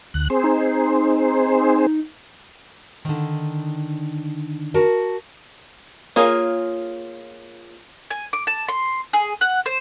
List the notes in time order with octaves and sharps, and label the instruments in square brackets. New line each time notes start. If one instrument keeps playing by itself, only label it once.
[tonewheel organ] D2 F#6
C4 G#4 C5
[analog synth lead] D#4
[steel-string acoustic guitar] D3 D#3
[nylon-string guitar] F#4 A#4 A5
[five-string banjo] A#3 F4 G#4 C#5
[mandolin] G#5
D6
A5
C6
G#4
F#5
C5